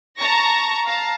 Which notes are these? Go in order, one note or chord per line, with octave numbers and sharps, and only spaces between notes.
A5 A#5 C#6 A#6
F5 A5 A#5